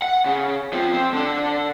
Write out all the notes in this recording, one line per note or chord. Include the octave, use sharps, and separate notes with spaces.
F#5
C#3
F3 C4
C4
D3 D4